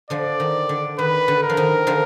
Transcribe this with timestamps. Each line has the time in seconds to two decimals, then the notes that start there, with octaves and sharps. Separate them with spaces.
0.10 D3 F3 D5
0.40 D#3
0.69 D3
0.98 D#3 B4
1.28 D3
1.43 A#4
1.49 F3
1.57 D#3
1.87 D3 F3